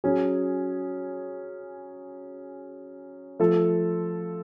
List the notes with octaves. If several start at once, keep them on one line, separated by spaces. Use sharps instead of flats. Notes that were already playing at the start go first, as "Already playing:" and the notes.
F#3 C#4 G#4
F3 A3 F4 A4